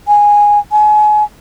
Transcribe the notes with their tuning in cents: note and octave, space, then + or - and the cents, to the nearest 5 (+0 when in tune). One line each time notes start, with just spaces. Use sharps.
G#5 -10
G#5 +30